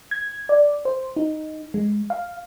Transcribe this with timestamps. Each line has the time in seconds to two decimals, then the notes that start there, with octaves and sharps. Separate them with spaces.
0.11 G#6
0.49 D5
0.85 C5
1.16 D#4
1.74 G#3
2.10 F5